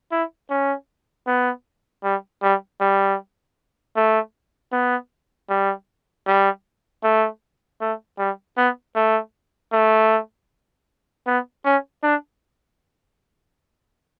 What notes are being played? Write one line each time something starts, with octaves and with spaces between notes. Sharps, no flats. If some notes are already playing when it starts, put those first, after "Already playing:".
E4
C#4
B3
G3
G3
G3
A3
B3
G3
G3
A3
A3
G3
B3
A3
A3
B3
C#4
D4